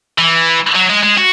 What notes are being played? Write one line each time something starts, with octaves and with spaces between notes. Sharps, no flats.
E3
F#3
G#3
G#3
F#4